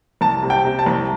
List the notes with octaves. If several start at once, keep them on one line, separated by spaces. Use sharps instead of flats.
C2 A5
C3
G5
C3
A5
C2